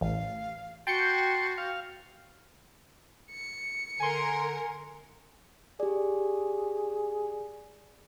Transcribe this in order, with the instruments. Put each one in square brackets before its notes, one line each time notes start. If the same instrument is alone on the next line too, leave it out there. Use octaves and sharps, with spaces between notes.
[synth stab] A1 [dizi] F5
[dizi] F#4 [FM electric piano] G5 G6 C#7 [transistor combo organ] A5 C6
[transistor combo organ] F5
[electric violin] C#7
[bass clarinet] D3 [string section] A#4 [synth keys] G#5 C6
[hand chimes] G4 D5 [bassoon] G#4